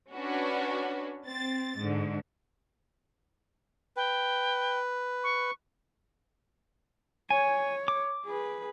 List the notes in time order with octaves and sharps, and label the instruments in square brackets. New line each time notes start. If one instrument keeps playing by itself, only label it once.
[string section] C#4 D4 F#4 B4
C4 A6
G#2 D3
[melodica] B4 [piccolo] G5
[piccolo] C#6
[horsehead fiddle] C#5 [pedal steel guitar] G#5
[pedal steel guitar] D6
[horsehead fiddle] G#4 B4